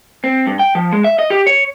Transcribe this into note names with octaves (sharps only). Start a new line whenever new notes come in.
C4
G2
G5
F3
G#3
E5
D#5
G4
C#5